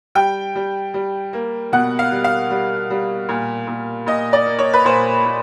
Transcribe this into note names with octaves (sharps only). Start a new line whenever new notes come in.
G3 G5
G3
G3
A#3
B2 F#5
F5
G3
F5
G3
G3
A#2
A#2
A#2 D#5
D5
A#3
C#5
B4
A#2 C5
A#2